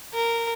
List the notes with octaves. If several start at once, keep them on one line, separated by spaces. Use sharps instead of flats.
A#4